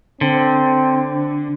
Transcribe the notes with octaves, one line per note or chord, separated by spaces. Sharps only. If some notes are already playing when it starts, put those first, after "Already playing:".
D3 C4